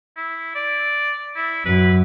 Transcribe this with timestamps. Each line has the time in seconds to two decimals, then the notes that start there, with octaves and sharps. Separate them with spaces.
0.17 E4
0.55 D5
1.36 E4
1.66 F#2 B4